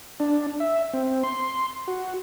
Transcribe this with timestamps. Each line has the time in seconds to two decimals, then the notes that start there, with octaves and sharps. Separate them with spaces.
0.20 D4
0.60 E5
0.94 C4
1.23 C6
1.88 F#4